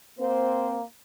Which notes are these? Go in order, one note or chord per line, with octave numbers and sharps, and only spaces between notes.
A#3 C4 C5